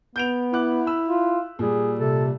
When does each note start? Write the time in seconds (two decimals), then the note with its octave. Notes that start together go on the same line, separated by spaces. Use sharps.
0.16 B3 G6 D7 F7
0.53 E4 F#5 D6 F#6
0.86 B5 E6
1.09 F4
1.59 A#2 G3 G#4
1.99 C3 A4